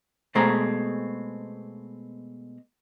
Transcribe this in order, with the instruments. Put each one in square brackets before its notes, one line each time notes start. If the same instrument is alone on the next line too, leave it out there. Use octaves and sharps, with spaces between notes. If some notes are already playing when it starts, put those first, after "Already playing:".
[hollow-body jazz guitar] B2 G#3 A3 C4 G#4 A#5